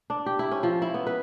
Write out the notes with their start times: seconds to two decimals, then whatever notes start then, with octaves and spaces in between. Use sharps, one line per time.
0.10 D4
0.26 G4
0.39 E4
0.51 C#4
0.63 F3
0.82 E4
0.94 B3
1.07 B4